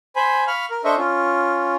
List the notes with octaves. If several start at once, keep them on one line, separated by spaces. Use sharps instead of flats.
C5 G#5 B5
F5 B5 C#6 F6
A#4
D4 A4 C5 D#5 E5 C#6
C#4 F4